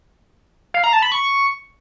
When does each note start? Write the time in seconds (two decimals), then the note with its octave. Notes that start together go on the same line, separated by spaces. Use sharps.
0.74 F5
0.84 A#5
0.93 A5
1.02 B5
1.12 C#6